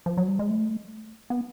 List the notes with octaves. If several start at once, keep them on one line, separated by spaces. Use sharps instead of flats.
F3
F#3
G3
G#3
A3
B3